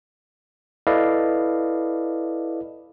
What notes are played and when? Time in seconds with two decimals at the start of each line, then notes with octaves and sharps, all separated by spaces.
0.87 E4 A4 B4 D5 D#5 F5